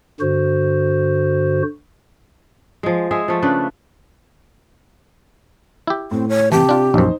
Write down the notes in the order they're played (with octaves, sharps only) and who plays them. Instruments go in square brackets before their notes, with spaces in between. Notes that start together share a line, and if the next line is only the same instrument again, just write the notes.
[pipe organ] G2 D3 F#4 C5
[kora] F3 G#3
G#3 G#4 E5
F3 A3
C#3 D4 B4
[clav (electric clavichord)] E4 G4
[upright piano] A2 [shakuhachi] C4
[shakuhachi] C#5
[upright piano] C3 A5 [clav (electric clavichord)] E3 [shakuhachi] G4
[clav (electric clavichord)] D4 F4
[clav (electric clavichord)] A#1 F#2 [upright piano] D#4 C5